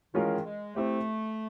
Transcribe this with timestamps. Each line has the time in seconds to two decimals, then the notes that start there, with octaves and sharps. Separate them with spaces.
0.14 D#3 E3 G#3 C#4 F4 A#4
0.44 G#3
0.75 A3 C4 E4 G4 C5